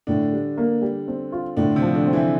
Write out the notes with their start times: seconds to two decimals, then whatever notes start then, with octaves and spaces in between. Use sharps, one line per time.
0.07 A2 D3 D4
0.33 G3
0.57 A#3
0.82 G3
1.08 C4
1.32 F4
1.57 A2 D3 D4
1.76 C3 C4
1.82 F3
1.94 D3 D4
2.07 C4
2.13 E3 E4